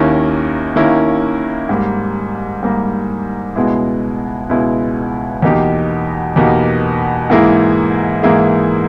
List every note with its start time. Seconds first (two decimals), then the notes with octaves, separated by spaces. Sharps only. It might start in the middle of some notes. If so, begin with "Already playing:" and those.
Already playing: D#2 D#3 A#3 C#4 E4
0.76 D#2 D#3 A#3 C#4 E4
1.69 G#2 G3 A#3
2.62 G#2 G3 A#3
3.56 C#2 B2 G#3 B3 E4
4.49 C#2 B2 G#3 B3 E4
5.42 E2 B2 A#3 D#4 G4
6.36 E2 B2 A#3 D#4 G4
7.30 G#2 E3 A#3 E4 G#4
8.23 G#2 E3 A#3 E4 G#4